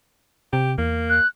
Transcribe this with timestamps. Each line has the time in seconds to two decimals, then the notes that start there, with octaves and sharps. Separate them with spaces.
0.53 C3 G4
0.78 E2 A#3
1.10 F#6